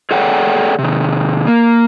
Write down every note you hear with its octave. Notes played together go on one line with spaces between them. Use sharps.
G#4 A4 C#5 D5 F#5 G5
C3 D#3
A#3